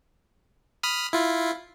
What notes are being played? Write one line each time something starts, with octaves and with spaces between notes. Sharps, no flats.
B5 D#6 F6
E4 F4